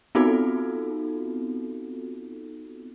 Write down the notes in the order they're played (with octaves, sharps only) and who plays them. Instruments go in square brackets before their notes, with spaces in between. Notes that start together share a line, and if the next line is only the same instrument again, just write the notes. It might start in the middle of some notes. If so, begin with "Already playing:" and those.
[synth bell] B3 C4 D#4 F4 F#4 A4